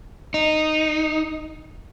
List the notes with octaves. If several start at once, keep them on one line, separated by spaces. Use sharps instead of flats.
D#4